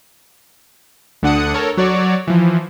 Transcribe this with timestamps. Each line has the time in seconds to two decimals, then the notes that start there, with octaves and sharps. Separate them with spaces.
1.23 D2 D3 D4 F#5 D#6 C#7
1.54 A4 A#4 C#5
1.77 F#3 F#4 C#5 D5
2.27 E3 F3